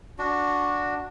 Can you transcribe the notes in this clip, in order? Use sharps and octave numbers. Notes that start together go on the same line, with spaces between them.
D4 F#4